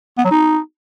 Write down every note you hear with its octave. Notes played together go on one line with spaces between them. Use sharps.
B3
F#3
D#4